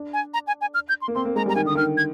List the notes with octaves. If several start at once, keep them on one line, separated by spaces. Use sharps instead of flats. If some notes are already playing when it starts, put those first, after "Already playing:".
Already playing: D4
G#5
A#5
G#5
G#5
F6
G6
C6
A#3
C4 C6
A#3
G#3 A#5
G3
A#5
D#3 G#5
D3 D#6
D#3 F6
G#6